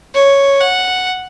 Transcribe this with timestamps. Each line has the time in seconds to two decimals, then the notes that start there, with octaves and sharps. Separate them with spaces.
0.14 C#5
0.60 F#5